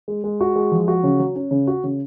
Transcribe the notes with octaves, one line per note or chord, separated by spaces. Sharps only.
G#3
G#3
F#4
G#3
F3
F#4
C#3
F#3
C#4
C#3
F#4
C#3